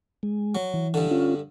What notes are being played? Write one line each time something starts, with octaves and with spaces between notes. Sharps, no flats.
G#3
F#3
E3
G2 D3
C#4 F4